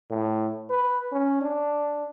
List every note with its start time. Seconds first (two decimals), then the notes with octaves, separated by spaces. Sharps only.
0.10 A2
0.70 B4
1.12 C#4
1.42 D4